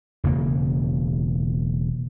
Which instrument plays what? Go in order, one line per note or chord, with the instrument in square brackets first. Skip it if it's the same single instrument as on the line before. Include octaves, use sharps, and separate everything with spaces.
[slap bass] E1 C#3 A#3